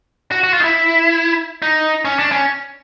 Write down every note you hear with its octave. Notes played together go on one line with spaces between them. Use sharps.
F#4
F#4
F4
D#4
E4
D#4
C#4
D4
C#4